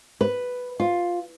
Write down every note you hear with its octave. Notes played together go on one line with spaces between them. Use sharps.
B4
F4